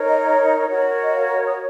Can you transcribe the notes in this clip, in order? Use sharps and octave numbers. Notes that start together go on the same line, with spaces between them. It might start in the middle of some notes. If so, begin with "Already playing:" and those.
Already playing: D#4 A#4 C#5
D#5
D#5
D#5
C#5
F#4 A#4 C#5
D#5
F5
D#6